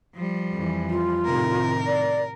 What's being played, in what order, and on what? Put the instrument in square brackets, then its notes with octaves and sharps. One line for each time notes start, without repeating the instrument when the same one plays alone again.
[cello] F3 G3
[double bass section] F2 E3
[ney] F4
[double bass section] A2 C3 D#3 [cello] A#4
[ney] D5